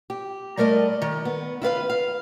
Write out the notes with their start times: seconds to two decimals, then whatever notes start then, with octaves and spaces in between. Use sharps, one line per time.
0.10 G4
0.57 G3 A3 A#4 D5 D#5
1.02 D#3
1.25 B3
1.62 E4 F4 B4 F5
1.90 F5